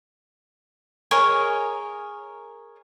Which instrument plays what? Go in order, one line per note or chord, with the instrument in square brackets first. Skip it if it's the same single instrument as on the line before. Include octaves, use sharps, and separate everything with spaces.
[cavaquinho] G#4 A#4 C#5 D#5